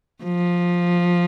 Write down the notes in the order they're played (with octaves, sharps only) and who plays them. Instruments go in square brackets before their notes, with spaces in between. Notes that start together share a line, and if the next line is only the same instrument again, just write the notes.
[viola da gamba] F3